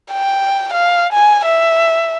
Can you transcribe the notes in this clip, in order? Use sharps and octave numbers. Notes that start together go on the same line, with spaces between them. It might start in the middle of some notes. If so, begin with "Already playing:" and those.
G5
F5
G#5
E5